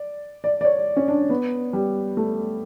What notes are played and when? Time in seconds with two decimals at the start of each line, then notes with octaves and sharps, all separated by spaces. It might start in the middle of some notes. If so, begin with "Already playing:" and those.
Already playing: D5
0.44 D5
0.61 D5
0.65 C#5
0.96 C#4
1.08 D4
1.30 B3
1.73 G3
2.17 A3